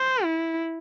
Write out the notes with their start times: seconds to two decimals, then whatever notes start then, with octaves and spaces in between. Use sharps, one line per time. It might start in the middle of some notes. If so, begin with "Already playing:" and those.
Already playing: C5
0.24 E4